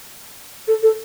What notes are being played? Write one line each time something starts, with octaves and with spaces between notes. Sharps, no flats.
A4
A4